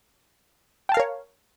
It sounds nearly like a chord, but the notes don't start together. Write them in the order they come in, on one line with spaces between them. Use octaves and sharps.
G5 A5 F5 A#4 C#5